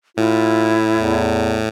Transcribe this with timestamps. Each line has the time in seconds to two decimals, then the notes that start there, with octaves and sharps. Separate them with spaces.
0.17 A2 E4 F4
0.93 E2